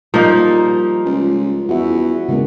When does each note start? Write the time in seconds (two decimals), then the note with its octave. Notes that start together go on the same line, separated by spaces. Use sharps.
0.14 F3 G3 A#3 D#4
1.06 C#2
1.69 E2 F#4 E5
2.29 E2 C#3 G#3 A#3